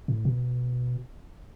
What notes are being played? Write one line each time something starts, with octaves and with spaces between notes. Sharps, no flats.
A2
B2